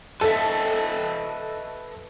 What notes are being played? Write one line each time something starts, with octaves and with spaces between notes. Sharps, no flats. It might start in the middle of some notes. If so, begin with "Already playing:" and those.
A4 B4 D#5 E5